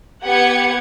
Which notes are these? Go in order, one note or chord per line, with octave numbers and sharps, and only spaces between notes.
B3 G4 B4 F#5 G#6 C#7